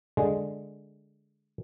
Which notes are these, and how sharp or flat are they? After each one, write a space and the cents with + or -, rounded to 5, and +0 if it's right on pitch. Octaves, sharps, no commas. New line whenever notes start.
D3 +0 G#3 +0